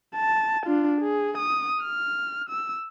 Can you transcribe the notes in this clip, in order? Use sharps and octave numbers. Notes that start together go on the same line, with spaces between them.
A5
D4 F4
G#4
D#6
F6
E6